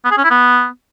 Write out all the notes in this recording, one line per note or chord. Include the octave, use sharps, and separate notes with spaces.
B3
G#4
C#4
E4
B3